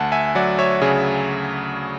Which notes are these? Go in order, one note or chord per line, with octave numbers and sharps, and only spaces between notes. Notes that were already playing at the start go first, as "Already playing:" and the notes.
Already playing: D2 F#5 A5
E5 G#5
F#3 D5 F#5
C#5 E5
C#3 G#4